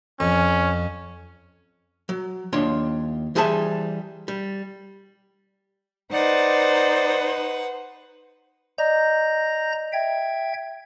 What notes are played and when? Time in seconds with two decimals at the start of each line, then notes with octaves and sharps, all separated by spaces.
0.20 F2 C#4
2.09 F#3
2.53 D#2 D4 F4 C#5 C6
3.35 E3 G3 G#4 C5 E5 A5
4.28 G3
6.12 D#4 B4 C5 D5 F#5
8.78 D5 D#5 A#5 G6 A#6
9.93 E5 G5 G#6